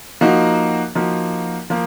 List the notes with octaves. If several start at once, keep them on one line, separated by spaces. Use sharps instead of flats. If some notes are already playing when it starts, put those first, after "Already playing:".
F3 A#3 D#4 F#4
F3 A#3 D#4 F#4
F3 A#3